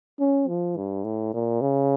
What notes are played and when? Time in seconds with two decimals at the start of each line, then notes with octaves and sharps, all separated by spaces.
0.20 C#4
0.48 F3
0.77 G2
1.04 A2
1.34 A#2
1.61 C#3